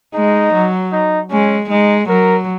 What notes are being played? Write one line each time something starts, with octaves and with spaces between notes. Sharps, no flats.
G#3 D#4
F#3
D#4
G#3 C#4
G#3 D#4
F#3 A#4